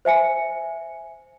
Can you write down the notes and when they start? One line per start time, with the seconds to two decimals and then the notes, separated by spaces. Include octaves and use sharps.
0.05 C5 E5 G#5 C#7